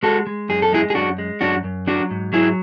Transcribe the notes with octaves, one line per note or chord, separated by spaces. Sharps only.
G#3 F#4 A4
G#3
F#2 G#4
A4
G#3 E4 G#4
G#4
F#2 D4 F#4
G#3
F#2 D4 F#4
F#2
F#3 D4 F#4
G#2
F#3 E4 G#4